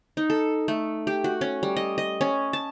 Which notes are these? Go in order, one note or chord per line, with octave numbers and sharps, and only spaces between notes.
D#4
A4
A3
G4
F#4
C#4
G3
D#5
D#5
C#4
A5